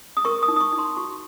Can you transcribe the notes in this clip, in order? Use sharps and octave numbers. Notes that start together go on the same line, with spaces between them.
D#6
A#4 C#6
D#6
D#4
D#6
C#6
D#4
C6
F#4 C#6